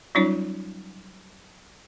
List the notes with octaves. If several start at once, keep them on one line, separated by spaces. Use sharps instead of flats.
F#3 G3 C#4 D#4 F4 C#5